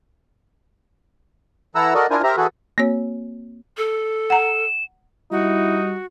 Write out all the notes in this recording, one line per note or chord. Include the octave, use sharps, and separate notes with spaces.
E3 E4 A4 F#5 A#5 E6
F#4 A4 A#4 D5 D#5
D4 E4 F4 A#4 C5 G#5
G4 A#4 C5 E5 A#5
E3 F#4 G#4 A4 B4
A#3 C4 F#4 C#5
A4
F#5 A#5 E7
G3 D#4 E4 F#4